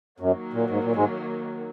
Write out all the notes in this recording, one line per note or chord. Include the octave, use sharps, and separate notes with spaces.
F#2 D#3 F#3 A#3
A#2
G#2
A#2
G#2 G#3